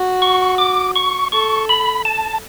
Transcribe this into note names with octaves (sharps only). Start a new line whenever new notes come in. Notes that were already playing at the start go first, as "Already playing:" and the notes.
Already playing: F#4
C#6
D6
C#6
A4 C#6
B5
A5